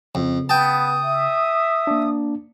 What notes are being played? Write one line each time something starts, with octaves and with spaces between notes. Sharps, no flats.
F2 C#3
B3 G5 A5 D#6
E5
A#3 D4